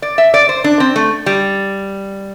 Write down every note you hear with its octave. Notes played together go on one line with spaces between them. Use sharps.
D5
E5
D5
C5
D4
C4
A3
G3